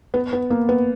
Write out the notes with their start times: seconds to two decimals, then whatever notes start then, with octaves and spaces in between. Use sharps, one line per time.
0.14 B3
0.33 B3
0.50 A#3
0.69 B3